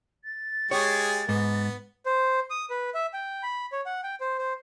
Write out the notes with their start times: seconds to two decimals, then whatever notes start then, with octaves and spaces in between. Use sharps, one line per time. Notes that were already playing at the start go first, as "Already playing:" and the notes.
0.24 A6
0.71 G#3 G4 G#4 C#5
1.29 G#2 B3
2.06 C5
2.50 D#6
2.70 B4
2.94 E5
3.14 G5
3.43 B5
3.72 C#5
3.86 F#5
4.04 G5
4.21 C5
4.38 C5